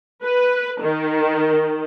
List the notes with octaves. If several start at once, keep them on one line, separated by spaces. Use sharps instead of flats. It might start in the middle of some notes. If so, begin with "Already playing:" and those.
B4
D#3